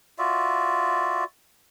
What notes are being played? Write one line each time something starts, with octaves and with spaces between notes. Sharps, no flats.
F4 F#4 D5 E5